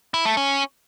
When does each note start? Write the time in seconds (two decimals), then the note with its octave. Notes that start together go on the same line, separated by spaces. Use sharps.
0.14 E4
0.25 A3
0.37 C#4